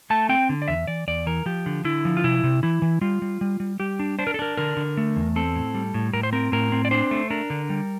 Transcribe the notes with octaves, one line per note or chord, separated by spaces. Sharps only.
A3 A5
C4 G5
D3
D5
E2 E5
E3 D5
E2 D5
E3 A#4
F3 G4
D3
D3 E4
F3
F4
C3 E4
C3
E3 E4
E3
G3 F4
G3
G3
G3
G3 G4
D4
D4 C5
A#4
A4
D4 A#4
D3 A#4
D3
A3
E2
C4 A4
A2
G3
A2
A2 A#4
C5
C4 A#4
A2 A#4
C4
D5
D4 C5
A3
D4 A#4
D3
G3